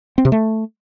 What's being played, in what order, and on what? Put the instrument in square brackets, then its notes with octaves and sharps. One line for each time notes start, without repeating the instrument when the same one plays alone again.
[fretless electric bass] C4
C3
A3